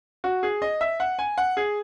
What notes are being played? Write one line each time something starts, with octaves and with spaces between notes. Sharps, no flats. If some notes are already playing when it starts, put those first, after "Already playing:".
F#4
G#4
D#5
E5
F#5
G#5
F#5
G#4